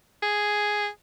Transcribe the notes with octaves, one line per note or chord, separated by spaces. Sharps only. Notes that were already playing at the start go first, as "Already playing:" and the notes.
G#4